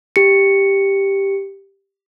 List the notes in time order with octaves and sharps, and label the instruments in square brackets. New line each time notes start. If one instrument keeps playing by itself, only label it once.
[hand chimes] G4 C#7